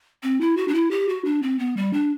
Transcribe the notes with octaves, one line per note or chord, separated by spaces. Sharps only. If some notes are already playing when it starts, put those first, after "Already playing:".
C4
E4
F#4
D4
E4
G4
F#4
D4
C4
B3
G3
D4